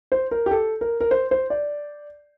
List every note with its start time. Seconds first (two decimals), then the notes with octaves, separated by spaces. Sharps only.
0.12 C5
0.31 A#4
0.46 G4
0.51 A4
0.81 A#4
1.01 A#4
1.11 C5
1.31 C5
1.50 D5